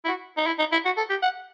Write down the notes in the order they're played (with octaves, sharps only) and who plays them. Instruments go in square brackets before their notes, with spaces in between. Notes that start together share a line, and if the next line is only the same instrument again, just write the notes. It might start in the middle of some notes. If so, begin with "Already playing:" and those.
[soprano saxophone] E4
F#4
D#4
E4
D#4
E4
F#4
A4
G4
F#5